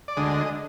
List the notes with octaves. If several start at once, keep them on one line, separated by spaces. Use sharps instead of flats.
D5
D2 D3 G#3 D#5